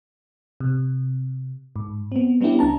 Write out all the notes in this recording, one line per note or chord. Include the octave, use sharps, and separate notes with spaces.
C3
G#2
B3 C4
G3 B3 C#4 D4 E4 G4
C#2 D4 A5 A#5